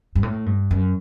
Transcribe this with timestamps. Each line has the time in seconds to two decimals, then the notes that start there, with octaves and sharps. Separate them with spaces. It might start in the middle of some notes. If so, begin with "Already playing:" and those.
0.15 G2
0.23 A2
0.46 G2
0.71 F#2